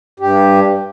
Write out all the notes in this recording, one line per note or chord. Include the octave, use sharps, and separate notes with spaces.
G2 G4